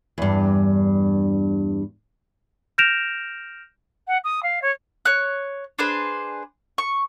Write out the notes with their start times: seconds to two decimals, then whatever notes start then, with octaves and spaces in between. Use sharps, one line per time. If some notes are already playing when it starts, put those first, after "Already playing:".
0.18 E2 G2
2.78 F6 G6 A#6 D7 E7 F7
4.07 F#5
4.24 D#6
4.43 F5
4.62 C#5
5.05 C#5 F#6
5.79 D4 G#4 B4 C5
6.78 C#6